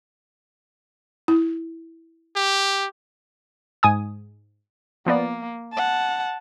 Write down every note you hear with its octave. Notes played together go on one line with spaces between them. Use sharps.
E4
G4
G#2 G#5 D#6
F3 A#3 B3 D5
F#5 A5